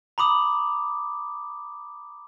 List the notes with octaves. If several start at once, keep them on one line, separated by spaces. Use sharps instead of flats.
A#5 B5 D6 D#6